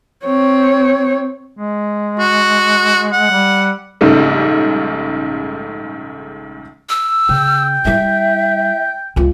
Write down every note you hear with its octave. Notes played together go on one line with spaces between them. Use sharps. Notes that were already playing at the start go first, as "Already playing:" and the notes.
C4 C#5
G#3
F#4
F#5
G3
A#1 G#2 C#3 G3 A3
E6
C#3 G5
G3 E4 E5
C#2 F4